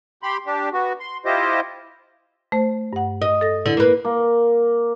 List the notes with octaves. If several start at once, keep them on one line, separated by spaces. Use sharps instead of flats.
G4 B5 C6
D4 G4
B3 F#4
C6
E4 F4 G4 C5 D#5
A3 C5
G2 F#5
D#5
A4 A#6
D3 E4
A#3 B4
A#3